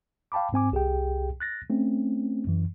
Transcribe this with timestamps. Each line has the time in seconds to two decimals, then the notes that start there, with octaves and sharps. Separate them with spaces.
0.32 F5 G5 A5 B5 D6
0.53 G#2 C4 G#5 D6
0.72 C2 G4 G#4 G5
1.40 F#6 A6 A#6
1.70 A3 C4 C#4
2.47 F#2 E3